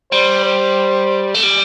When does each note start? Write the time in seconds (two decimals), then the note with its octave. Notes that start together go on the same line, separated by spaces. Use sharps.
0.12 G3 C5
0.45 C5
1.35 A3
1.44 G3